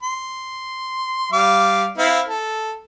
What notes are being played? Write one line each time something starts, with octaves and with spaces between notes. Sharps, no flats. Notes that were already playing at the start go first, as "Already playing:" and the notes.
C6
G3 F5 D6
C4 E4 F5
A4